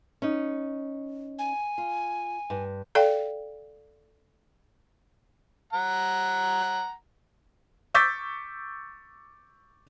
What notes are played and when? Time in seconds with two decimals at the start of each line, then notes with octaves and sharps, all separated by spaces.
0.22 C#4 D#4
1.38 G#5
1.78 F4
2.50 G2
2.95 A4 D5 F5 G5
5.73 F#5 A#5
7.94 C#6 D6 E6 G6 A6 B6